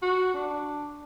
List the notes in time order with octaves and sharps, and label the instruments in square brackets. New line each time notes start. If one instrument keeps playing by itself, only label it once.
[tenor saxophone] F#4
D4